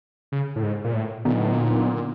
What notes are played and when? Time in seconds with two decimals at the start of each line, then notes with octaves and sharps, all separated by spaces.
0.32 C#3
0.56 A2
0.63 G#2
0.84 A#2
0.94 A2
1.25 A#2 D3 F#3 B3 D#4
1.38 A2
1.52 A#2